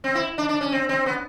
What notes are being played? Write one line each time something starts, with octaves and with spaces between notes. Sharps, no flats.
C4
E4
D4
D4
C#4
C4
C4
B3